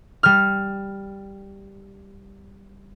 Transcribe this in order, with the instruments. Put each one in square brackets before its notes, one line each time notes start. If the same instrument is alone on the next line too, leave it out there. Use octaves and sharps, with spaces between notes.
[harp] G3 F6